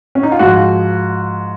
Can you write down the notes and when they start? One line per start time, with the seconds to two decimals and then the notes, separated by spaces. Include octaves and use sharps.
0.15 C#4
0.23 D#4
0.32 F4
0.39 G#2 F3 F#4